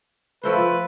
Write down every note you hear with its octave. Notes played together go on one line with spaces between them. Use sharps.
F3 A3 B4 C5